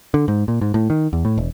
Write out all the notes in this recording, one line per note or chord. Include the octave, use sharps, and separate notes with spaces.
D3
G#2
A#2
G#2
A2
D#3
E2
A2
E1